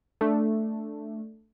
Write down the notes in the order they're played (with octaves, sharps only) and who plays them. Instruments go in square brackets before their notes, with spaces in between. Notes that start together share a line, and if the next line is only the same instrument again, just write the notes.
[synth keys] A3 D4